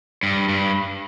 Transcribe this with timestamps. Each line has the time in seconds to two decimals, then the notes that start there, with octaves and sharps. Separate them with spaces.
0.23 G2
0.49 G2